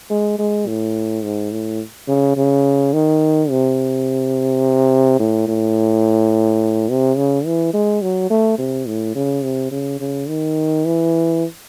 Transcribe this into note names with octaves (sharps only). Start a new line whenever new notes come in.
G#3
G#3
A2
G#2
A2
C#3
C#3
D#3
C3
A2
A2
C3
C#3
E3
G#3
F#3
A3
C3
A2
C#3
C3
C#3
C#3
D#3
E3